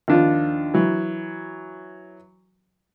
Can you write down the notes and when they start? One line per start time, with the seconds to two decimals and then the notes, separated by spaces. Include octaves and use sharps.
0.08 D#2 F3 D4 F4
0.74 E3 F#3